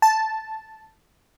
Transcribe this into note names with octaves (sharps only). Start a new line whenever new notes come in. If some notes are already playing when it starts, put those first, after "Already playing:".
A5